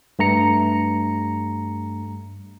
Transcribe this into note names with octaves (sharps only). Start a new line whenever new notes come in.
G2 A3 A#5 C#7